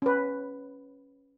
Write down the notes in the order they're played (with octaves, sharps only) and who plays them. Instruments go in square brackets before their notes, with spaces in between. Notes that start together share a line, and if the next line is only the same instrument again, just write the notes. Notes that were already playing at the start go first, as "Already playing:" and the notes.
[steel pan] C#4 B4